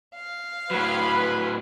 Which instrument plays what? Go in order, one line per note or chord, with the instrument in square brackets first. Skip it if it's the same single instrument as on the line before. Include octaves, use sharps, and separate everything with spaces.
[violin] F5
[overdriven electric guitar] A2 F#3 [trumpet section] B4